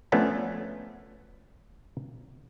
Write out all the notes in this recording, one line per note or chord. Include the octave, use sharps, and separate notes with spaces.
F3 A3 B3 C#4 D4